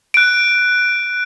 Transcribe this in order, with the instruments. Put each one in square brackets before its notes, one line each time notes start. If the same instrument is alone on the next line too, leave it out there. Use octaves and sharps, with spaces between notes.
[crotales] F#6 D7